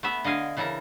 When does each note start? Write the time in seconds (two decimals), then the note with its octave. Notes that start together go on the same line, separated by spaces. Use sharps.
0.03 A3 B3 E5
0.24 D3 D#5 F5 G#5
0.57 C#3 E3 A4 A#4 A#5